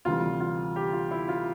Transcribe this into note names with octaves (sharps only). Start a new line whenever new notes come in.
D2 C3 E3 G3 F4
F4
G4
F4
E4
F4